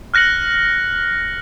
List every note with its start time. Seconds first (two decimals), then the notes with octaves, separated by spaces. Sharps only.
0.14 F6 F#6 A#6 C#7 F#7